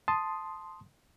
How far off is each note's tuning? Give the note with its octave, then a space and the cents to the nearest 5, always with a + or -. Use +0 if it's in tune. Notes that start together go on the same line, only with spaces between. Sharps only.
A5 +0 C6 +0 D#6 +0